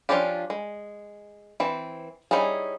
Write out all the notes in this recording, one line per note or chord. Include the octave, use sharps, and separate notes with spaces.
F3 C#4 D4 F4 G4
G#3
E3 C4
G3 C#4 D#4 E4 G#4